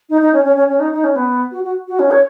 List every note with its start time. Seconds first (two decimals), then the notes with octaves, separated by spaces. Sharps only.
0.09 D#4
0.21 D#4
0.33 C#4
0.45 C#4
0.56 C#4
0.69 C#4
0.80 D#4
0.93 D#4
1.04 C#4
1.16 B3
1.52 F#4
1.63 F#4
1.88 F#4
1.99 C#4
2.11 C#5